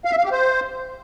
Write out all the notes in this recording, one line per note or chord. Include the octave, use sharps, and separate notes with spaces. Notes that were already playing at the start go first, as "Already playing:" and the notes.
F5
E5
F5
G4
C5